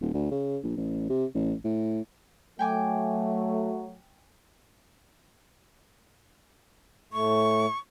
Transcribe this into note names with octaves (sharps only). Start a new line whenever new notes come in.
D#1
D2
C#3
A#1
A1
C3
A1
A2
F#3 A3 G5 G#5 D6
A2 A3 C#6